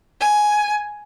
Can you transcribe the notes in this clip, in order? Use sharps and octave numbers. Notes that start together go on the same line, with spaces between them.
G#5